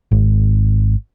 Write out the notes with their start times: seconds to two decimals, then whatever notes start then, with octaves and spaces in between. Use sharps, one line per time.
0.11 G#1